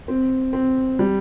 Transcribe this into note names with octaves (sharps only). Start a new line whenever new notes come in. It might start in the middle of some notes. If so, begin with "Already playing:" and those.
C4
C4
G3